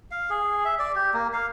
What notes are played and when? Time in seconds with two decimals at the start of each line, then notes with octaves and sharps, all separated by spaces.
0.11 F5
0.30 G#4
0.65 E5
0.79 D5
0.95 G4
1.14 A#3
1.33 F5